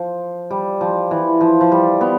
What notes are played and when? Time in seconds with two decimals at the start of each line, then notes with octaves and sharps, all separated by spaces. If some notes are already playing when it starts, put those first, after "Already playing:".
Already playing: F3
0.51 G3
0.81 F3
1.11 E3
1.41 F3
1.61 F3
1.72 G3
2.01 B3